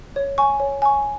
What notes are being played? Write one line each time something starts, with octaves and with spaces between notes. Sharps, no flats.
C#5
G#5 C#6
C#5
G#5 C#6